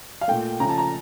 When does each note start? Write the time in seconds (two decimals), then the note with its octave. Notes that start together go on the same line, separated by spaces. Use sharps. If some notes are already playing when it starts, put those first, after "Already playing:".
0.21 F5
0.28 A#2 A3 G5
0.60 C#3 F3 A3 A#5
0.69 A5
0.78 A#5